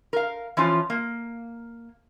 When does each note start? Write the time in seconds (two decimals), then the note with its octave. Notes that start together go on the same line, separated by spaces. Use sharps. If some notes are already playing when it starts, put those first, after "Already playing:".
0.13 A#4 F5
0.57 E3 F3 C#4 F4
0.90 A#3